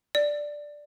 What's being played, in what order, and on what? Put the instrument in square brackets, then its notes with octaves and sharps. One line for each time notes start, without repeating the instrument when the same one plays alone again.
[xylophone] D5